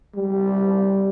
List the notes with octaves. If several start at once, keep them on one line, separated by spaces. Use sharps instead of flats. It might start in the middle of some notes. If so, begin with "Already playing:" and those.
G3